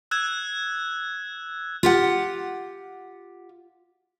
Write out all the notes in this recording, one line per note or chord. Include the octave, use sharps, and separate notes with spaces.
E6 F#6 G#6 E7
F4 G4 F#5